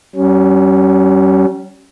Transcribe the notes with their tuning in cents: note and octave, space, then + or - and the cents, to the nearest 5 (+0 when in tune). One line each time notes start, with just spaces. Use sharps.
G3 -45 C#4 +0